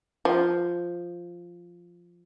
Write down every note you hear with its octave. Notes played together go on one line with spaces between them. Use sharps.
F3